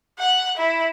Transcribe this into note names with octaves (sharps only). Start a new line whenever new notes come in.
F#5
E4